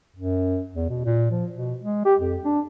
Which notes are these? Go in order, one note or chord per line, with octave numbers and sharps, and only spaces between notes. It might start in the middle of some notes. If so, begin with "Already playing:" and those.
F#2
E2
B2
A#2
F3
B2
G#3
G4
F2
D4